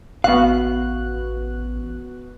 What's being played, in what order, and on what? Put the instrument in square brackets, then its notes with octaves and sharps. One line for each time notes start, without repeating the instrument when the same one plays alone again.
[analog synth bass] A1 [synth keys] B3 F#4 F#6 [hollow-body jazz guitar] F5